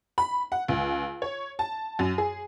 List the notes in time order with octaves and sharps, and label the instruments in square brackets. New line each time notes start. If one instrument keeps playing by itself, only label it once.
[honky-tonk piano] B5
F#5
C#2
C#5
A5
F#2
G#4